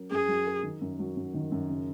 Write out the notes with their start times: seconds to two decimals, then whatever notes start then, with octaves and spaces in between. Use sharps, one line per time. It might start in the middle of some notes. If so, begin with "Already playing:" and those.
Already playing: F#3 C#4 A#4
0.11 F#2 G#4
0.28 F#3
0.46 A#4
0.63 D#3
0.81 F#2
0.99 F#3
1.17 F#2
1.34 D#3
1.52 F#2
1.69 C#3